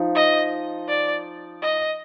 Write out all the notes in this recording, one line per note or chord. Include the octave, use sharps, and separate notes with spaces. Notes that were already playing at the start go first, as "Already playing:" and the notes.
Already playing: F3 D#4
D#5
D5
D#5